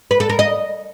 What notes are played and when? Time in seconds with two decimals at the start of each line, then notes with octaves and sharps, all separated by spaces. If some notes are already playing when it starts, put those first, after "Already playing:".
0.11 B4
0.20 A4
0.29 A#4
0.39 D#5